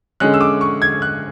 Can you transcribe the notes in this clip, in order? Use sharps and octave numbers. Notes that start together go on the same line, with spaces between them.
D3 G#3 C#4 F#6
E6
D6
C#6
G#6
F#6